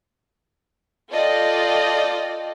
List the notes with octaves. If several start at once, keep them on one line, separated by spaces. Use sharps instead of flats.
F4 A4 D5 D#5 G5